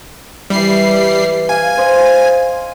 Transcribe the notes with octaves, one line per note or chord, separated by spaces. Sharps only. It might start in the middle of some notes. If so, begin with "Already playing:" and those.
E3 G3 E4 C7
F5 G#5
C5 D#5 F5